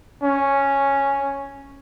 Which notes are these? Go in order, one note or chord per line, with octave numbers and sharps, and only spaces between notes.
C#4